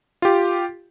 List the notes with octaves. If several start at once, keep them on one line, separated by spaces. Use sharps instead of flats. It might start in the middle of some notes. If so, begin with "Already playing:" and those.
F4 G4